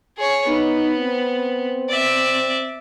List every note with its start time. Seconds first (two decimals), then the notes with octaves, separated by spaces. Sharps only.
0.18 G#4 C#5
0.48 B3 D#4
0.98 C4
1.89 D5 E5